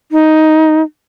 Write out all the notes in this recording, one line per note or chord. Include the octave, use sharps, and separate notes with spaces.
D#4